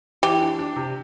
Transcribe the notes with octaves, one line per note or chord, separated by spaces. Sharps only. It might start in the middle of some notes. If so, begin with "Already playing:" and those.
E3 G4
D4
D4
C3